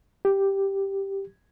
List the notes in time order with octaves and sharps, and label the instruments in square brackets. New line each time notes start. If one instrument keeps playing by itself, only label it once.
[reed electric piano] G4